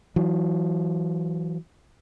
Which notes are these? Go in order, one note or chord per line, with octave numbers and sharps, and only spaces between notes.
E3 F#3